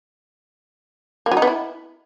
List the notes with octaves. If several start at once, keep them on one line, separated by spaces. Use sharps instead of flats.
A#3
F#3
D#4
B3
E4